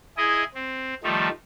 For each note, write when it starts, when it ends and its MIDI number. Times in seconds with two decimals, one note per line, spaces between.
0.17 0.44 64
0.17 0.44 68
0.17 0.44 75
0.54 0.94 60
1.04 1.29 51
1.04 1.29 53
1.04 1.29 55
1.04 1.29 57
1.04 1.29 63